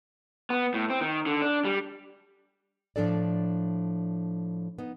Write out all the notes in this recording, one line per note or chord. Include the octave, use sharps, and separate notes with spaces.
B3
A2
C4
D#3
D3
D4
G3
A2 F3 D4 A4 D5
B3 D#4